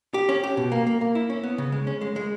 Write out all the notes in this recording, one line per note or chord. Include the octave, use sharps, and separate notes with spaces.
G4
C#4
G4
B2
A#3
A#3
A#3
E4
C#4
B3
C#3
G#3
C#4
G#3
G#3